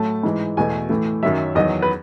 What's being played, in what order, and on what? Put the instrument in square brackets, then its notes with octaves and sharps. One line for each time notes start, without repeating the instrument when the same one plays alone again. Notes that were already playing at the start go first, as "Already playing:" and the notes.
Already playing: [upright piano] A2 F#3 A3 A5
G#2 E3 G#3
E2 B2 A3 G#5
A2 E3 A3
F#2 D#3 F#3 E5
E2 D#3 F#3 D#5
B4